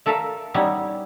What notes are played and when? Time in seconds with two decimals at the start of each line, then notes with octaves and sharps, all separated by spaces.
0.06 A3 A4 A#4 E5 F5
0.54 G3 B3 C#4 D#4 E4